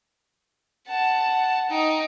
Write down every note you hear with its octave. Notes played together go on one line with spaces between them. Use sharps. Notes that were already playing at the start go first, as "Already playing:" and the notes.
F#5 A5
D#4 G5